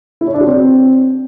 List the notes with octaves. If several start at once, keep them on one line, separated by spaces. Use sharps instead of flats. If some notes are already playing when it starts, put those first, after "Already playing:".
E4
C#5
D4
F#4
C4